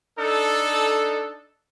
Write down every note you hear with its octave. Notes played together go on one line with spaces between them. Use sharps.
D4 D#4 A4